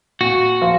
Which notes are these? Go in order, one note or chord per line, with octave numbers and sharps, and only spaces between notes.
A#2 F#4
F3 A#3 F4